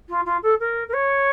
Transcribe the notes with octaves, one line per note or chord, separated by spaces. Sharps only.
F4
F4
A4
A#4
A#4
C#5